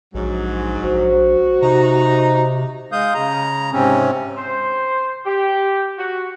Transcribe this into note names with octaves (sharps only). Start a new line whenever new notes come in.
A#1 G#2 F#3
A#1 F#4 C5
C3 D#4 A#5
G#3 F5 D#6 G6
C#3 A#5
G#2 C3 C4 C#4
C5
G4
F#4